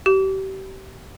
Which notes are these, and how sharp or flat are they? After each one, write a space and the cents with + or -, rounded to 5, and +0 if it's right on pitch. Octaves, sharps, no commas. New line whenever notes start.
G4 -35